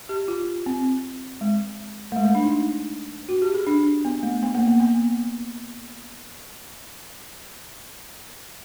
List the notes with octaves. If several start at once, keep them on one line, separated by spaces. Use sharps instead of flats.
G4
F4
C4
G#3
A3
G#3
A3
D4
D#4
F#4
G4
G#4
D4
B3
A3
B3
A#3
A#3
B3